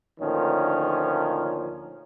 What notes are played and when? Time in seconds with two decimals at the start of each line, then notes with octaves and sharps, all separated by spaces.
0.20 D2 A#2 D#3 F3 C#4